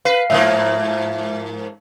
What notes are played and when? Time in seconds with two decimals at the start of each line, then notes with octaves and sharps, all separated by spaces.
0.05 B4 F5 C7
0.30 G#2 F3 A#3 E5